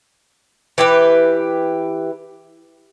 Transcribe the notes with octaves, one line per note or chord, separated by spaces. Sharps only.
E3 G4 B4